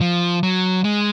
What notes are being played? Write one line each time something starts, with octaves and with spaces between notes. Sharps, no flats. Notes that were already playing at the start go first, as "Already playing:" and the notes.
F3
F#3
G#3